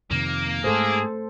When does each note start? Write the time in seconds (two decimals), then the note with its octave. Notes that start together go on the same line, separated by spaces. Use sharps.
0.11 F2 C3 D#3 A#3
0.64 G#2 A3 G#4 A4 C5